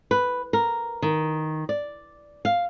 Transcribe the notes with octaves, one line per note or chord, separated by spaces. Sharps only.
B4
A#4
D#3
D5
F5